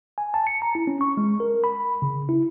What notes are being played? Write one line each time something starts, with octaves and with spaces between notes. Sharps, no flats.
G#5
A5
C#7
A#5
E4
C#4
C#6
G#3
A#4
B5
C#3
E4